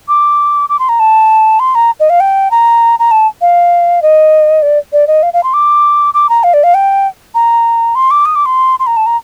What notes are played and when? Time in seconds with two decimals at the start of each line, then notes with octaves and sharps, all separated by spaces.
0.08 D6
0.69 D6
0.79 C6
0.89 A#5
0.99 A5
1.59 C6
1.75 A#5
2.00 D#5
2.09 F5
2.20 G5
2.51 A#5
2.99 A#5
3.11 A5
3.41 F5
4.02 D#5
4.62 D5
4.92 D5
5.07 D#5
5.23 F5
5.33 F5
5.43 C6
5.53 D6
6.14 D6
6.29 A#5
6.43 F5
6.53 D5
6.63 F5
6.74 G5
7.34 A#5
7.95 C6
8.11 D6
8.25 D#6
8.35 D6
8.45 C6
8.79 C6
8.86 A#5
8.97 A5
9.06 A#5